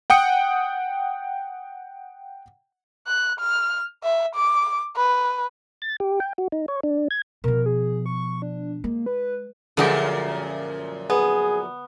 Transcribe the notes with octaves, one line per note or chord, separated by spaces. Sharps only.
F#5 G5 D#6 C#7
F#6
F6
E5
D6
B4
A6
G4
G5
F#4
D#4
C#5
D4
G#6
B2 F3 A#4
G#4
C#6
D4
G#3 A#3
B4
F#2 A#2 D3 F3 G#3 G4
B3 G#4